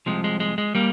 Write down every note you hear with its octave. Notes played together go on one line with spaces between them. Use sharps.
C2 C3 F3 G#3
G#3
G#3
G#3
G3 A#3